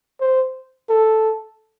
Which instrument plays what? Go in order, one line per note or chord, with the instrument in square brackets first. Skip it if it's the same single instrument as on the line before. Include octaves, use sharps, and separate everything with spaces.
[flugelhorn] C5
A4